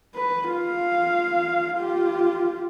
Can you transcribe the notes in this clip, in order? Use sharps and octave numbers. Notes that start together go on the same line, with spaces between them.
B4
F4 F5
F4 G4